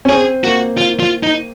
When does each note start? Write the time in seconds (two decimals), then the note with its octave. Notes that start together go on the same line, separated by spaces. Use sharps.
0.05 C#4
0.09 C4 G#4
0.44 A#3 F#4
0.77 F4
1.00 F4
1.23 D#4